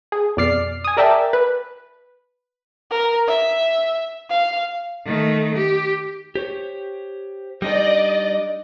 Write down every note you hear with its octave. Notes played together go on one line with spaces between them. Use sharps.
G#4
F2 B2 D5 F6 C7
G#5 D#6
G#4 A#4 D5 E5 G5 A5
B4
A#4
E5
F5
D#3 A3
G4
G4 C5 C#5
G3 D4 D#4 D5 D#5